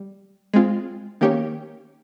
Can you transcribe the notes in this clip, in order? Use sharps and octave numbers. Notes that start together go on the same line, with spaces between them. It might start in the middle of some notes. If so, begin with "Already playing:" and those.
Already playing: G3
G#3 C4 F4
D#3 A#3 C#4 G4 C#5